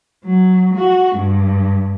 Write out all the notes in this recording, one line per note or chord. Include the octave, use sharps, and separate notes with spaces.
F#3
F#4
G2